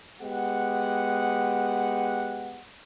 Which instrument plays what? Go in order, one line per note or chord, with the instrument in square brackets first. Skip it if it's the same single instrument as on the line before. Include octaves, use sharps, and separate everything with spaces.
[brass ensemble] G#3 B3 G4 F#5